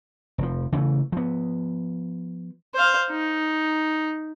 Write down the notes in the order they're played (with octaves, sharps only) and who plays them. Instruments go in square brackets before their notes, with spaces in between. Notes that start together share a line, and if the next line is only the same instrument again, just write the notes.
[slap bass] F1 F3
C#3 E3 G3 A3
F3 B3
[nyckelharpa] C5 F5
D#4